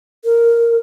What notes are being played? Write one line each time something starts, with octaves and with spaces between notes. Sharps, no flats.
A#4